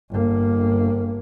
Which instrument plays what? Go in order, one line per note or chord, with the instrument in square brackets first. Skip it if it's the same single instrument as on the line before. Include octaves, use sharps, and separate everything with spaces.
[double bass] G1 A#3